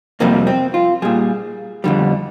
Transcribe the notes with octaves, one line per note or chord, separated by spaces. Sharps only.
F2 C3 G3 A#3
C4
F4
A#2 G3 G#4
F2 D3 G3